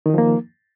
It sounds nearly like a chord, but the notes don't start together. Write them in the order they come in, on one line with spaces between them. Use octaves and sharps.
D#3 D#4 F3 A#3